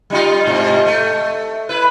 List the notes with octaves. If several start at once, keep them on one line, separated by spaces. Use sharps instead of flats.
G3 D#4 F4
G#2 C3
A3
E4 B4